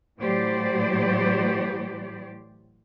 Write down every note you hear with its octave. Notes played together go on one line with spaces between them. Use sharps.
A2 E3 F#3 G4 C5 D5